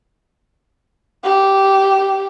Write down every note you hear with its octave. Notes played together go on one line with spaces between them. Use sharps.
G4